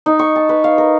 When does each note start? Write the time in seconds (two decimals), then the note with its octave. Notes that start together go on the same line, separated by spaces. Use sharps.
0.06 D#4
0.19 C#6
0.36 A5
0.49 B4
0.64 F5
0.78 A#4